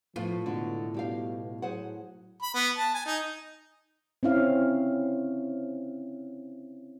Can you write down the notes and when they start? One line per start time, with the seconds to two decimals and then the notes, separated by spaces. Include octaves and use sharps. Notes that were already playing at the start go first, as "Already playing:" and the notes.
0.16 A2 F3 B3 F4
0.46 B2 D3 G#3
0.94 B2 G3 G4 F5
1.62 F#3 G#4 C5 F#5
2.42 B5
2.55 B3
2.78 A5
2.94 G#5
3.06 D#4
4.23 C4 C#4 E4 F5